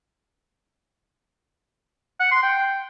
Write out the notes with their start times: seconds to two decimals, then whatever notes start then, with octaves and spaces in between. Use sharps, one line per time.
2.20 F#5
2.32 C6
2.43 G5